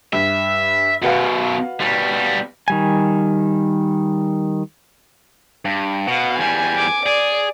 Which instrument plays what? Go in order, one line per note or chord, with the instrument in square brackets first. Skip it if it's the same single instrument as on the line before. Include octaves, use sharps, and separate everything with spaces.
[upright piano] G2 [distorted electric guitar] E5
[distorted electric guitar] F#2 B2 [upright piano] F#4 B4 F5
[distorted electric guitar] B2 G3
[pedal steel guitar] D#3 G3 G#5
[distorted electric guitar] G2
[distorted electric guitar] B2 [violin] F5 F#5
[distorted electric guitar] E2 G3 [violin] G#5
[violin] G#5 D6
[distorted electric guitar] G#4 [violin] D5